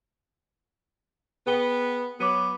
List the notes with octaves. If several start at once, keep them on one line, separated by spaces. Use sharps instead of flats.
B3 G#4 G5 G7
F#3 B3 D6 D#7